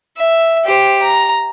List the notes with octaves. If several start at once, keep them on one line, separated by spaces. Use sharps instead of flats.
E5
G4 C5
A#5